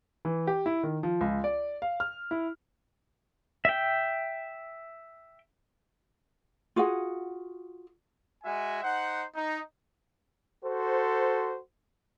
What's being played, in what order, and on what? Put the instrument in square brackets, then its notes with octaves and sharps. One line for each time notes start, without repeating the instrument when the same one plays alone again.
[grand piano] E3
G4
E4
D#3
F3
C#2
D5
F5
F6
E4
[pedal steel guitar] E5 G5
[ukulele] F4 F#4 G#4 F#5
[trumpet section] G#3 F#4 E5 G#5
D#4 C5 F#5
D#4
[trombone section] F#4 A4 C5